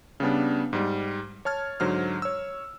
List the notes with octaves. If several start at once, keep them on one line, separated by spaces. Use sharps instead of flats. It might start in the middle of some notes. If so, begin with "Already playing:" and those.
C#3 G3 B3 D4
G#2 G3
C#5 A5 F6 G#6
G#2 D3 F#3 C5 F6
C#5 E6